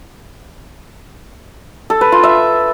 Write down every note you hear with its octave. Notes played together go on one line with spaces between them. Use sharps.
A4
B4
F4
E5